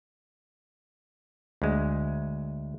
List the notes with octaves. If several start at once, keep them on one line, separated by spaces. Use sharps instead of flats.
D2 G#3